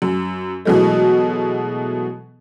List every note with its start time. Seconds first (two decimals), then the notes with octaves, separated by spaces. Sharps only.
0.02 F#2
0.65 B2 E3 F#3 G#3 A3